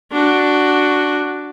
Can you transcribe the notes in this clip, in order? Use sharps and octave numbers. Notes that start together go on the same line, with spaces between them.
D4 F#4